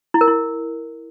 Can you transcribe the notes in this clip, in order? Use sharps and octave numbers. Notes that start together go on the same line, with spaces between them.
E4
A#4
E4